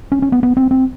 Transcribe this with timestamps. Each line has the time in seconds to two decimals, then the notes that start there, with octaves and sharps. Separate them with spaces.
0.12 C#4
0.22 C#4
0.32 B3
0.43 B3
0.57 C4
0.71 C4